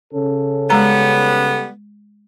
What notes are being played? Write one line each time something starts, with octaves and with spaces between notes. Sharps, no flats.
C#3 C#4 A4
G3 G#3 B3 A#5